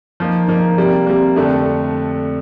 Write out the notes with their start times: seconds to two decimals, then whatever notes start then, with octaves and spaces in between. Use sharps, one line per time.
0.20 F3 A#3 D#4
0.48 F3 A#3 D#4
0.78 C3 G3 A#3
1.07 C3 G3 A#3
1.36 F2 D3 A3 D4